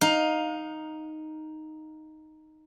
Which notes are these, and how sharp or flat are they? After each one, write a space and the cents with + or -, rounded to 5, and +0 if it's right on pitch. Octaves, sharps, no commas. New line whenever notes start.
D#4 +0 F5 +15